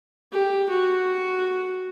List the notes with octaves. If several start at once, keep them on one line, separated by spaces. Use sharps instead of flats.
G4
F#4